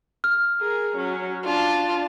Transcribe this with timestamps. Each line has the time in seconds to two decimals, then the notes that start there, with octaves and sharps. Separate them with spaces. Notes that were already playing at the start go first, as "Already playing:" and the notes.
0.24 F6
0.60 G#4 A#4
0.97 F#3 C#4
1.44 D4 F4 A5